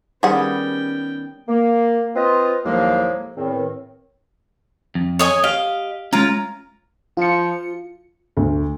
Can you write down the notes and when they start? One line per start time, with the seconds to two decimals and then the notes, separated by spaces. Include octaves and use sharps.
0.23 D#3 G3 B3 C#4 G#4 F#5 G5
1.48 A#3
2.16 C4 F4 B4 D#5
2.65 D#2 A2 F3 F#3 G#3 A#3
3.36 E2 A2 D#3 C4
4.95 F2
5.19 C#5 D#5 G#5
5.44 G4 D#5 F5
6.13 G#3 C#4 F4 A#5
7.17 F3 F4 C#7
8.37 D2